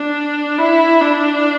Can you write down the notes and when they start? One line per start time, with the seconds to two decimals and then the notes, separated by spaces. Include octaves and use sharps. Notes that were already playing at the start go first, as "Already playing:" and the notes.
Already playing: D4
0.58 E4
1.01 D4